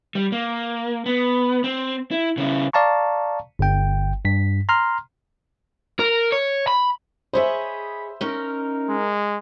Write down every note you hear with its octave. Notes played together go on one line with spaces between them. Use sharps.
G3
A#3
B3
C4
E4
C#3 E4
D5 F5 A5 A#5 C#6
G1 G5
G2 B6
A#5 C6 F6
A#4
C#5
B5
G#4 C5 C#5 D#5 E5 B5
C#4 D#4 A#4
G#3